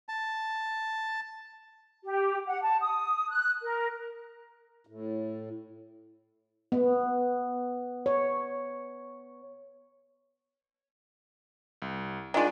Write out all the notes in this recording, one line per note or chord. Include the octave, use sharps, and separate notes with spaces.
A5
G4
F#5
A5
D#6
F#6
A#4
A2
B3
C#5
C2
D#3 G#3 D4 F4 D5